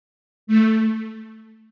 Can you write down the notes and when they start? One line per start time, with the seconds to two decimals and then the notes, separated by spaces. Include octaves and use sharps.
0.47 A3